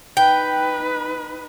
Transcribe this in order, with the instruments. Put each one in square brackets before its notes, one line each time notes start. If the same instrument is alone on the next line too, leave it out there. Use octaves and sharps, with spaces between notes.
[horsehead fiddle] D#4 B4 [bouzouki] G5